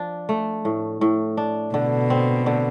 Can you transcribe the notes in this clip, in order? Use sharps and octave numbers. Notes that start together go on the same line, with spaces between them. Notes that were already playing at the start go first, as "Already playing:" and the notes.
Already playing: F3 D4
A3
A2
A2
D4
B2 D3
C4
D3